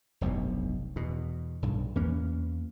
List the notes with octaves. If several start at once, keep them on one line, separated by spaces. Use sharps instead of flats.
F1 B1 G2 B2
E2 B2
B1 G2
E2 E3 A#3 C#4